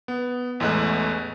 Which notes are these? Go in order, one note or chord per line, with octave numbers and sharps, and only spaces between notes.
B3
A1 E2 G#3 A3 D#5 F#6